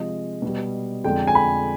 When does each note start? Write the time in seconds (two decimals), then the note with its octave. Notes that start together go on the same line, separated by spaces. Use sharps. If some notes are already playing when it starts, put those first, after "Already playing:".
Already playing: C3 F3 G#3 D#5
0.42 B2 G3
1.04 F2 D3 G#3 G5
1.27 G#5
1.35 B5